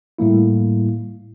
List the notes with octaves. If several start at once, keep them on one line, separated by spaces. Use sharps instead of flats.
A2 G3 A#3 E4